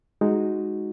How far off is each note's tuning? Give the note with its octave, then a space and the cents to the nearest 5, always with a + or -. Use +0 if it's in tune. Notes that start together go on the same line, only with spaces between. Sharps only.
G#3 +0 D#4 +0 F#4 +0